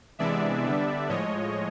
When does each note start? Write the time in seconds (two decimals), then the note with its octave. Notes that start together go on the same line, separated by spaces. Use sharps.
0.19 C3 E3 G#3 B3 D4 D5 E5
0.64 D3 G3 B3 D4
1.09 A2 F3 G#3 C#5 D#5